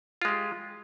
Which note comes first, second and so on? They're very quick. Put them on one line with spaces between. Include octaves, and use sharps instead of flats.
F4 G#3 G4